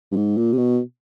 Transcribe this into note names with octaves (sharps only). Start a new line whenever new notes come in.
G2
G#2
A#2
C3
B2